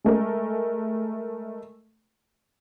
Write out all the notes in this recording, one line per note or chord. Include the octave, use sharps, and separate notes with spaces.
G#3 A3 A#4